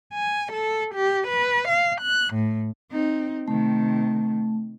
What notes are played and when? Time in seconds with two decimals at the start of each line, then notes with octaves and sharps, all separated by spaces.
0.14 G#5
0.53 A4
0.95 G4
1.29 B4
1.68 F5
2.01 F#6
2.34 A2
2.91 C4 D#4
3.48 C3 D#3 A3